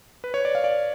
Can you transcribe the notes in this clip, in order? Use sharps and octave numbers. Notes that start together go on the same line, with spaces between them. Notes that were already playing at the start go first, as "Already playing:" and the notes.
B4
C#5
D5
F5
D5